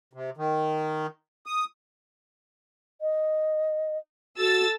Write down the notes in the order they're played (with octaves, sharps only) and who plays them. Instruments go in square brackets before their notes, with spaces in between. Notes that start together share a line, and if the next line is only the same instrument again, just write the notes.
[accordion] C3
D#3
D#6
[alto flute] D#5
[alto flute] F#4 [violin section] A4 E6 A6